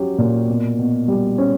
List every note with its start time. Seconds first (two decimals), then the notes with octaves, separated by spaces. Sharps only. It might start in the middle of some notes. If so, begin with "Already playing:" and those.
Already playing: F#3 C#4 G4
0.18 A#2
0.48 B2
0.79 B2
1.08 G3
1.38 C#4